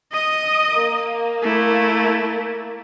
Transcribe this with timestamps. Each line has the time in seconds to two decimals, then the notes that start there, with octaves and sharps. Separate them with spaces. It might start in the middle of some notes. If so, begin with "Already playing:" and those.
0.12 D#5 D#6
0.74 A#3
1.42 A3 E4